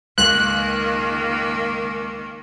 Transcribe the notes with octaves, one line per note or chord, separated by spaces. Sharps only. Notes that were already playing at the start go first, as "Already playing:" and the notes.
C#2 D#3 A#3 F#6